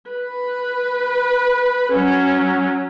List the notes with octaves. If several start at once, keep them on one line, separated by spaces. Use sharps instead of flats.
B4
F#3 C#4